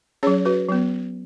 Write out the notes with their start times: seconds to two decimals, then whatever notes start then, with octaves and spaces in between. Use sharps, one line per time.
0.23 F#3 C#4 G#4 C#5
0.45 F#4 B4
0.69 F#3 B3